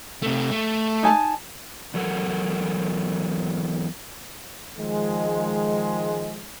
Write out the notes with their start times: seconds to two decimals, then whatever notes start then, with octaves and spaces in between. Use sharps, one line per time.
0.23 C3 A3
0.52 A3
1.03 D#4 G#5 A5
1.94 E2 F#3 A4 A#4 F#5
4.78 D#3 F3 G#3